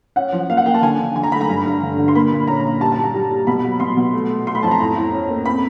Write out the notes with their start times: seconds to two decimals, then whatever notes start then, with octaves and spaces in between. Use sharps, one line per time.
0.16 C#4 F#5
0.32 F3
0.49 A#3 F5
0.57 F#5
0.66 A#3 G5
0.74 A5
0.82 D3 G#5
0.99 D3
1.15 D3 G#5
1.23 A#5
1.32 A3 B5
1.41 A#5
1.49 G2
1.66 G2
1.82 D3
1.98 D3
2.08 C6
2.15 A#3 B5
2.31 A#2
2.47 C#4 A#5
2.65 A#2
2.81 G3 A5
2.92 A5
2.98 G3
3.04 A#5
3.14 G3
3.31 G3
3.47 B2 B5
3.64 F#3
3.80 B2 C6
3.97 B2
4.13 A3
4.31 A3
4.46 A3 C6
4.55 B5
4.63 F2 A5
4.71 A#5
4.80 A2
4.96 A2
5.12 C#4
5.29 A#3
5.46 C4 B5